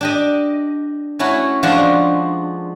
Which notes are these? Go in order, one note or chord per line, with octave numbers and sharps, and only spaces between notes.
D4 G4 D#5
A3 C#4 E4 F#4
F3 G#3 D4 F4 F#4